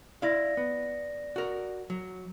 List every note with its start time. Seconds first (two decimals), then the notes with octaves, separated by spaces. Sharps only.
0.22 E4 D5 F5 A#6
0.57 B3
1.36 F#4 A#4
1.90 F#3